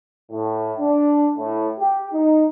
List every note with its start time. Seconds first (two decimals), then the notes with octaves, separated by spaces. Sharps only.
0.31 A2
0.79 D4
1.37 A2
1.79 G4
2.13 D#4